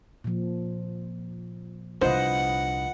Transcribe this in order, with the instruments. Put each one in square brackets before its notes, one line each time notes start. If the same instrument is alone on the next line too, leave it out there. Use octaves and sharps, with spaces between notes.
[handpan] A#2 F3
[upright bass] C2 D4 [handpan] F4 B4 D#5 [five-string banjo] C5 [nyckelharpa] F#5